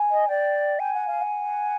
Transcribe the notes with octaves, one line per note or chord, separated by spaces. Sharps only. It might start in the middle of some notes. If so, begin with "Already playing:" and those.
Already playing: G#5
D#5
D5 G5
G5 G#5
F#5
F5
F#5